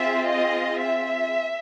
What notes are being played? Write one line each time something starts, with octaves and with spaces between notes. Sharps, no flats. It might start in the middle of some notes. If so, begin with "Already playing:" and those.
Already playing: C4 F4 G#4 E5
D#5
E5